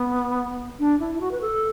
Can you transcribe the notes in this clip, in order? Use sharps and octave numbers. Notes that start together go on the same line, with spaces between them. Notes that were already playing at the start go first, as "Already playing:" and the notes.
Already playing: B3
D4
E4
E4
F#4
B4
A4